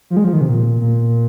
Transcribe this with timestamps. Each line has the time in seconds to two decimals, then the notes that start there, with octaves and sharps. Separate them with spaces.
0.10 F3
0.17 G#3
0.24 F3
0.33 D#3
0.41 C3
0.49 A#2
0.81 A#2